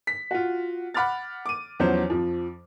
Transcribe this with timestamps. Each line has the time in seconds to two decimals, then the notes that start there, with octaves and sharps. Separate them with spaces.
0.07 B6
0.31 F4 F#4
0.94 F#5 B5 D6 F6 A6
1.46 D6 D#7
1.79 E2 F3 F#3 C#4 C5
2.10 F2 F3